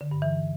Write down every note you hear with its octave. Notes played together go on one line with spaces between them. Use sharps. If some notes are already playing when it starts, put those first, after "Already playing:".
D3
G2
E3